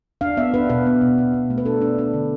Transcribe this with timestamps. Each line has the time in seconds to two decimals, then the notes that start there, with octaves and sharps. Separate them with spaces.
0.21 D4 F5
0.37 B3 E5
0.54 D4 B4
0.70 B2 B4
0.86 B3
1.01 B2
1.18 B2
1.34 B2
1.50 A3
1.58 B4
1.66 D4 A4
1.82 D4
1.98 D4
2.14 D3